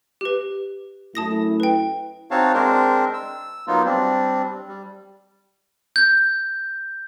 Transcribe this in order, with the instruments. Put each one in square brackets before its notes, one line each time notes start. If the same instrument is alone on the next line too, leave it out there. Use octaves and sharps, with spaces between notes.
[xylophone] G4 B4
[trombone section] F#2 A3 E4 [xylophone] A5 D#6 A#6
[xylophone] B4 G5
[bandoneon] C4 D#4 F#4 C#5 F5 A5
G#3 C4 D4 A#4 C5
E6
F#3 A#3 B3 D#4 F4
G3 C4 D4
G3
[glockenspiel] G6